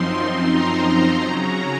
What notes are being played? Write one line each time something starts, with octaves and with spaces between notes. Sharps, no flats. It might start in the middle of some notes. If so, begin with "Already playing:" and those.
Already playing: F#2 F3 C4 D#4 C6
A#5
C6
C#3 F#3 C#4 A#5